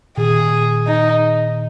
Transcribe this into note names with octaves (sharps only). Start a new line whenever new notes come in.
A#2 D#3 G#4
D#4